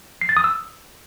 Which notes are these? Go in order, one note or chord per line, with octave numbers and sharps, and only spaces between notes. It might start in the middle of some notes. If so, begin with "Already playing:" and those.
C7
A6
D#6
E6